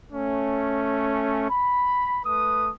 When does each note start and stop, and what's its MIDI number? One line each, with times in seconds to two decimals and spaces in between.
0.12 1.50 57
0.12 1.50 61
1.50 2.20 83
2.25 2.71 57
2.25 2.71 71
2.25 2.71 87